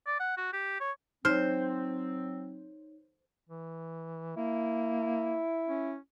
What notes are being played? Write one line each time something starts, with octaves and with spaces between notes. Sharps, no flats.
D5
F#5
F#4
G4
C#5
F#3 C4 D#4 C5 C#5 F6
E3
A#3 E4
C#4